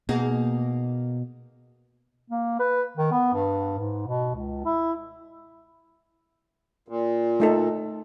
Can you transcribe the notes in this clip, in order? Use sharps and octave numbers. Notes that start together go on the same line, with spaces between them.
B2 A#3 D#4 G#4
A#3
B4
D#3
B3
G2
G#2
B2
C#2
E4
A#2
A3 D#4 A4